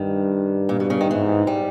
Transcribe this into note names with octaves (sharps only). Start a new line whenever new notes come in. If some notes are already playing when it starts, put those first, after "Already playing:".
Already playing: G2 D#3
A#2
B2
C#3
D#3
G#2 E3
G3